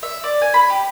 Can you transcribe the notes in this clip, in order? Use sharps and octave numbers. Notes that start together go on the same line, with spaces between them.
E5
D5
G#5
B5
G4